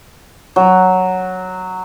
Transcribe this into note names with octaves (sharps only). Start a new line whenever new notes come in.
F#3